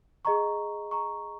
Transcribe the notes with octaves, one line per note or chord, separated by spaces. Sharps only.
G#4 D#5 A#5 C#6
A#5 C#6